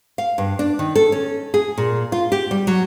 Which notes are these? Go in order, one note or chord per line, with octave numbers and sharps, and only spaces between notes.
F5
G2
D4
D#3
A4
C#4
G#4
A#2
F4
G4
G3
F#3